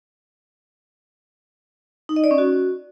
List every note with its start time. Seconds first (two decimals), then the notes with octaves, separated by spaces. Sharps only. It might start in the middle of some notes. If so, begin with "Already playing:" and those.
2.09 D#4
2.16 D#5
2.24 D5
2.31 C#4
2.38 F#4